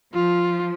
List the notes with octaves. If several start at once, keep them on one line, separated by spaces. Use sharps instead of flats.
F3 F4